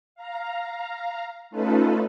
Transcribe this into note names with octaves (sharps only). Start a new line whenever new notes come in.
F5 A#5
A3 C#4 D#4 F4 A4 B4